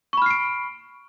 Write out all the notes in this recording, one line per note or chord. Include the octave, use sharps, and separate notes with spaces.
B5 C#6 F6 C7 D7